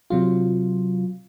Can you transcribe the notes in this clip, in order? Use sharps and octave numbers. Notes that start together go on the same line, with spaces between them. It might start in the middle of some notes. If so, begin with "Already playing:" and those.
C3 F#3 F4